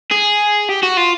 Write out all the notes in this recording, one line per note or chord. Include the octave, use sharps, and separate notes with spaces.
G#4
G4
F#4
F4